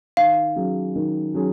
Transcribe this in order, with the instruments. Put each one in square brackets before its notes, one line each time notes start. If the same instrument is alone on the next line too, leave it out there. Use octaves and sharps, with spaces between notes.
[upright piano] D#3 [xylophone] F5
[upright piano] F#3 C#4 G#4
D#3
F#3 C#4 G#4